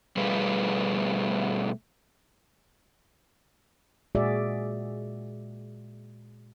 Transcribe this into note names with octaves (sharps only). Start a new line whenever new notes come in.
B2 G3 A3 F4 G#4 B4
A#2 G#3 F#4 G#4 D5 E5